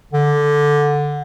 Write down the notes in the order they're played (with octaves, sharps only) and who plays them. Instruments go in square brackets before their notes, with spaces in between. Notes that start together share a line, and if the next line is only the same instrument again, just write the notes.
[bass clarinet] D3